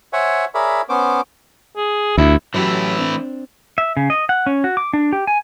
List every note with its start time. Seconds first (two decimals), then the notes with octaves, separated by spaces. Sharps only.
0.13 C5 C#5 E5 F#5 G#5
0.55 G#4 A#4 C#5 D5 E5 B5
0.89 B3 C#4 C5 D6
1.76 G#4
2.18 D2 E4
2.54 E3 F#3 A3 C#4 E4 G4
2.99 C4 D4
3.78 E5
3.97 C#3
4.10 D#5
4.29 F#5
4.47 C#4
4.64 F#4
4.77 D6
4.93 D4
5.13 G4
5.27 G#5